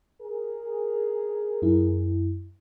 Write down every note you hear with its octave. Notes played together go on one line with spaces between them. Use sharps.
G#4 A#4
F#2 E4